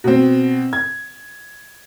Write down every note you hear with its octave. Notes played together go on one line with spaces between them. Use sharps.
B2 C4
G#6